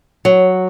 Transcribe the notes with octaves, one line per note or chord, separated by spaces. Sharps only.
F#3